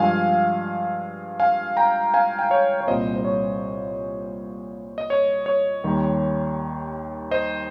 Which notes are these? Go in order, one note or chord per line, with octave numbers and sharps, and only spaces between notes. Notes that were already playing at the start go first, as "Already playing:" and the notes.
Already playing: G2 F3 G#3 F5 G#5
F5 G#5
G5 A#5
F5 G#5
G5
C#5 F5
C#5
C2 A#2 G3 C5 D#5
C5
C#5
D#5
C#5
C#5
D#2 D#3 G3
C5 D#5